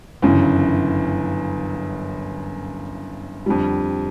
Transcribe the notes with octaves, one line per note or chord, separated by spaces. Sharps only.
G1 F#2 C#3 E3
F2 D3 G3